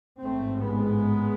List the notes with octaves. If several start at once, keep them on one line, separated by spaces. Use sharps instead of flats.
A1 G#2 A3 C4
G#3 B3